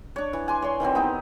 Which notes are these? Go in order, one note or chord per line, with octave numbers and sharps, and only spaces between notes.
D4 C#5
E3
G#5 C6 D6
C#5 D5 C6
D#3 E3 F#3 C4
B3 D#4 G4